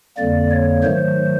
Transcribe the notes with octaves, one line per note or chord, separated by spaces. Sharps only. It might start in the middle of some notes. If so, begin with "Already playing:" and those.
F2 D3 G3 A#3 D5
C#5
G#2 D#3 F#3 A3 C5